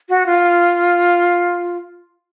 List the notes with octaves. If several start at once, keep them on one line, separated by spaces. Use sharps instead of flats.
F#4
F4